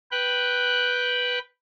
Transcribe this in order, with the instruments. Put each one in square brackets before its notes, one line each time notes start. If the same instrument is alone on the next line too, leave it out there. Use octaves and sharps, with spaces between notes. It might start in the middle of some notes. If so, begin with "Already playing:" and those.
[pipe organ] B4 G5 F#6